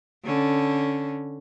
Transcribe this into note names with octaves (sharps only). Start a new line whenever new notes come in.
D3 C#4